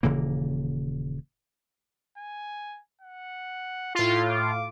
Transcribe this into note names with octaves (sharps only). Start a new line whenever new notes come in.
D#1 C#3 E3 A#3
G#5
F#5
A2 F4 C6
D6